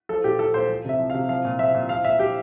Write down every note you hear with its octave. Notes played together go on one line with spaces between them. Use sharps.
F3 A4
A#2 G4
F3 A4
A#2 C5
F3
C3 E5
F3
C3 F5
F3 F5
A#2
F3 E5
A#2
F3 F5
A#2 E5
F3 G4